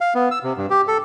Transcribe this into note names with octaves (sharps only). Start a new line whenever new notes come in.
F5
B3
E6
C3
G2
G4
A4